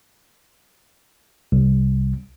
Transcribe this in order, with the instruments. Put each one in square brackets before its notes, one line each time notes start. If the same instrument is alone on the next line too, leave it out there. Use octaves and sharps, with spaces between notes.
[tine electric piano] C2